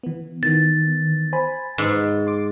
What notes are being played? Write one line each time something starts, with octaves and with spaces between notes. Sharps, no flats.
E3 B3
D#3 E3 B3 A6
C5 G#5 B5
G#2 B4
C6 D6